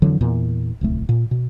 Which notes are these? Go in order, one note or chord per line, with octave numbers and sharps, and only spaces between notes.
F2 D3 E3 F#3
E2 A#2
D1 C2 A3
A#2
B2